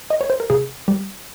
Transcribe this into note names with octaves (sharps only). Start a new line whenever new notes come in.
D#5
C#5
C5
A#4
C3 G#4
G3 G4